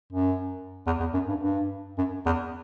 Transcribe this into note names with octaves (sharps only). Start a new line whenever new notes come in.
F#2
E2
E2
F#2
G2
G2
F#2
E2